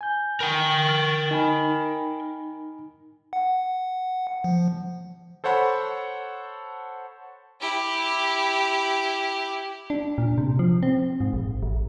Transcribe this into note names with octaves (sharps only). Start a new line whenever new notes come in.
G#5 G6
A#4 G5
F6 A6
D#4 G#5 B5
F#5
F3
A4 C5 C#5 F#5 A5 B5
E4 G4
D4
A#2
C3
F3
C4
G#2
A#1
A1